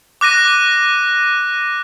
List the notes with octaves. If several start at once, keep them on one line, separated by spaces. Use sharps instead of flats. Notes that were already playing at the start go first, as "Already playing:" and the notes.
D6 F#6 A#6 D#7